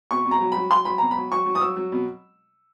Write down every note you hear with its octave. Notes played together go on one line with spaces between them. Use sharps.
B2 C#6
B2
A#5
F#3
F#3 B5
F#3 C6
F#3 B5
B2 A#5
B5
F#3
F#3 C#6
F#3
D#6
F#3 E6
F#3
B2